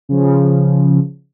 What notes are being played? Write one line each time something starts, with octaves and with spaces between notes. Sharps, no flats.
C#3 F3